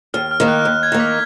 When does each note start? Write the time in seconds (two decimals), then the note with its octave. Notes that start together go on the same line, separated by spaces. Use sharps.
0.14 D#2 F6
0.31 F6
0.40 D#3 A#3
0.48 F#6
0.65 D#2 F#6
0.83 G#6
0.92 D#3 A#3
1.00 B6